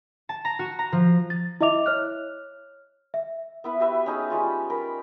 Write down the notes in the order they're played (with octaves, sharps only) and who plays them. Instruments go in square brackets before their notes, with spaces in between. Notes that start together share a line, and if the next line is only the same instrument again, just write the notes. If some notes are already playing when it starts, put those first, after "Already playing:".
[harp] A5
A#5
F#4
A#5
F3
[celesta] A6
E4 D#5 E5 D6 F7
C#5 F6 F#6
E5
[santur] B3 E4 B4
F#4 G4 B4 E5
C#4 D#4 G#4
G3 G#3 C#4 F4
A#4 B5